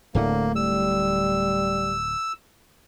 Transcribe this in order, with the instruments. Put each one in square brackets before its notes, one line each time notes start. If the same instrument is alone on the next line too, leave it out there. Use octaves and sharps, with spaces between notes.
[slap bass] D1 A2 A3 [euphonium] D3 [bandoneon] A#3
[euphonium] G3 [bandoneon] E6